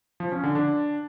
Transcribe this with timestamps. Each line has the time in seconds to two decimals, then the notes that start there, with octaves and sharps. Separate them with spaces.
0.20 F3
0.32 C#4
0.43 D3
0.55 D4